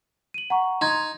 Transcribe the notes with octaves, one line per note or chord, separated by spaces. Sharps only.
D#7 F#7
F#5 A#5 C#6
D#4 C6 G#6